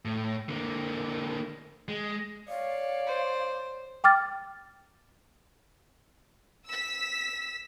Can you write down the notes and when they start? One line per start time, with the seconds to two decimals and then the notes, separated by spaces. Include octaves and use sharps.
0.05 A2
0.49 D3 A#3
1.88 G#3
2.49 C#5 D5 F5
3.07 C5
4.04 G5 D6 F6 A6
6.68 E6 B6